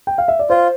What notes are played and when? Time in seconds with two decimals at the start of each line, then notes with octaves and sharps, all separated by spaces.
0.07 G5
0.18 F5
0.28 E5
0.39 D5
0.50 F4 C5